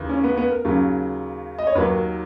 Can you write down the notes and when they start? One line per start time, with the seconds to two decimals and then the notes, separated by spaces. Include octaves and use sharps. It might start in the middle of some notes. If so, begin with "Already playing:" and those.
Already playing: D#2 C#3 E3
0.09 C#4
0.24 B3
0.37 B3
0.51 A#4
0.65 D#2 C#3 F#3
1.58 D#5
1.67 C#5
1.75 D#2 D#3 F#3 B4
1.94 A#4